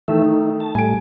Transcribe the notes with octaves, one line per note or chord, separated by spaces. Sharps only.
D#3 E3 A3 A4 E5
D#4
A5
A2 G3 A3 G#5 D7